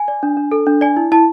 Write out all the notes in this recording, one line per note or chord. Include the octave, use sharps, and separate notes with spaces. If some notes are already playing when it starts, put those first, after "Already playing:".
Already playing: G#5
D5
D4
D4
A4
D4
D5 G#5
E4
E4 A5